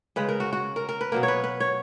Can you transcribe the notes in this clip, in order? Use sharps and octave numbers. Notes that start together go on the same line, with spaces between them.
C#3 G#3 B4
A#4
F#4
F#4
A#4
A#4
B4
B2 F#3 A#3 A#4
C#5
B4
B4
C#5